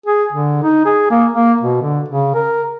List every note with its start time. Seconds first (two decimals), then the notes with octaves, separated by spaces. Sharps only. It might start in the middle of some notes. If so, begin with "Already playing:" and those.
0.06 G#4
0.33 D3
0.63 D#4
0.85 G#4
1.11 A#3
1.33 A#3
1.61 B2
1.82 D3
2.08 C#3
2.35 A#4